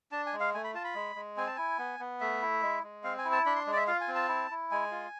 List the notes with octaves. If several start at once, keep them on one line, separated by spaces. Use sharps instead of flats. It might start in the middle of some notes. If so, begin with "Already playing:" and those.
D4 A5
G#5
G#3
F5
A3 G#5
B5
F4 A5
B5
G#3
G#3
C4 G#5
A5
E4 G#5
B3
B3
A3 E5
E4
G#3
G#3
C4 F5
G#5
E4
A5
D4 B5
C6
G#3
D5
E5
F4 F5
G#5
C4
A5
E4
E4
G#3 G#5
F4